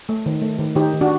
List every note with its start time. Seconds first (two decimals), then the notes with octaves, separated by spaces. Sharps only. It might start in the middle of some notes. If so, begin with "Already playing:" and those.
0.09 A3
0.26 D#3
0.42 A3
0.59 D#3
0.75 D#3 D#4 G4
0.93 D#3
1.01 D4 F#4